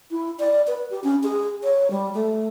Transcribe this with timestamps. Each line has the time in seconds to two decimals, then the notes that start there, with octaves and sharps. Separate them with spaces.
0.11 E4
0.40 D5
0.67 B4
0.90 G4
1.04 C#4
1.23 G#4
1.63 C#5
1.90 G3
2.14 A3